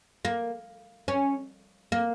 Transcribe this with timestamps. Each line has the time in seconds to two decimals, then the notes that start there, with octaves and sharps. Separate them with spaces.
0.25 A#3
1.08 C#4
1.92 A#3